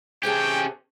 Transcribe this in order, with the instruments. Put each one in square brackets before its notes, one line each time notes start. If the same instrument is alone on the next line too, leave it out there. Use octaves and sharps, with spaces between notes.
[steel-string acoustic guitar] C3 G#4 A5 [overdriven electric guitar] C#4 G4 [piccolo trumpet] G5